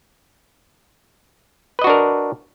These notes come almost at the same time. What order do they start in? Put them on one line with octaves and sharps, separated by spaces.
B4 D#5 F#4 D4 A#4